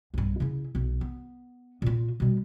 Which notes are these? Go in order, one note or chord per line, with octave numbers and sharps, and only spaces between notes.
B1 G2
C#3 E4
B1
B3
A#2 F4
B2 G3